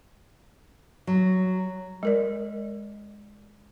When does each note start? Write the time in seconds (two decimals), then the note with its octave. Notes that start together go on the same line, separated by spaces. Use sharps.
1.07 F#3
2.03 G#3 A#4 D5